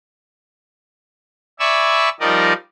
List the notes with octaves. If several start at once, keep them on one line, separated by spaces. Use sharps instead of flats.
D5 E5 G#5 B5 C#6 E6
F3 G3 D#4 A#4 D5 D#5